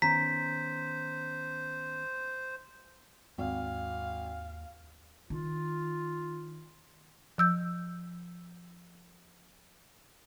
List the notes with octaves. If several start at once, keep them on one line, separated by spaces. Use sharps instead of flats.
D#3 B3 C#4 C5 A#5 B6
G#1 D#2 F5
D#3 F4
F3 E6 G6